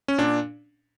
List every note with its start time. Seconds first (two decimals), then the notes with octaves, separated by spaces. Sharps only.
0.08 C#4
0.18 A#2 D4